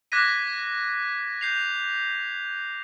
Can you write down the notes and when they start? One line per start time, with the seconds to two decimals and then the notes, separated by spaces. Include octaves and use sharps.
0.12 D6 F#6 G#6 A#6 B6 D#7
1.41 G6 C7 F7